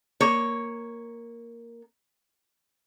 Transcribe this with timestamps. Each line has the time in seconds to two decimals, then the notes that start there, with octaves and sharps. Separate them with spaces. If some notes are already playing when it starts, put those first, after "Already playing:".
0.20 A#3 C#5